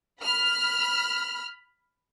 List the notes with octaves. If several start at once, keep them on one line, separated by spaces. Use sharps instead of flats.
B5 F6